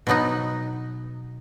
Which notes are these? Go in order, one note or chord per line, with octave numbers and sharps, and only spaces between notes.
B2 F#3 B3 D#4